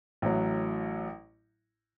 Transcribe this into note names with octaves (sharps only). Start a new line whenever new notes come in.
A1 A2 F#3